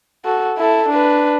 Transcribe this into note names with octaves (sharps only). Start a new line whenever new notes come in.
F#4 A4
E4 A4
D4 B4